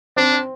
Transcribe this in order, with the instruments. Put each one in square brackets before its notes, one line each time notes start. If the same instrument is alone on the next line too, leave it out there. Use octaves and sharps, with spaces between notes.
[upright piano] C4 [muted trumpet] D4